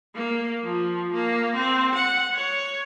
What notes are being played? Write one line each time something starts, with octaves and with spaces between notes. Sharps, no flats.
A#3
F3
A#3
C4
F#5
C#5